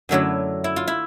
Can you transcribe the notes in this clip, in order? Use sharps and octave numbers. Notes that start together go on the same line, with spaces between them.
F#2 D3 F#3 A3 E4
E4
F4
E4